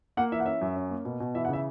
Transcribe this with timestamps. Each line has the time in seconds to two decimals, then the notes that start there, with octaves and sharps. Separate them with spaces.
0.17 A#3 F#5
0.32 E3 E5
0.40 F#5
0.46 C#4 E5
0.61 F#2
0.76 C#4
0.90 A#3
1.05 B2
1.20 B2
1.35 E3 E5
1.45 F#5
1.48 C#3 E5